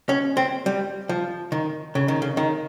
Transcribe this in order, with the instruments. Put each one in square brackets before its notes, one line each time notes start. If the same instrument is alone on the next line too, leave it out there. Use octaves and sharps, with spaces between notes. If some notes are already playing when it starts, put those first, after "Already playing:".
[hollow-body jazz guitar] C#4
C4
G3
F3
D#3
C#3
D#3
C#3
D#3